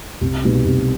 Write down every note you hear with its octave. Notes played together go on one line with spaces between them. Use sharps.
C2
B2 G3 B3 D#4
C2